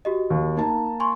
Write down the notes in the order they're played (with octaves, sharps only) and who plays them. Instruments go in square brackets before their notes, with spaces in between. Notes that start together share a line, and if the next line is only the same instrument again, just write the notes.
[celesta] F#4 G4 D#5
[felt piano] D#2
[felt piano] A#3 A5 [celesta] D#4
[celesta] G#5 C6 C#6